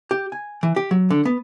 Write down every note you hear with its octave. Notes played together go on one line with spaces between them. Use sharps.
G4
G#5
E3
G4
F#3
D3
B3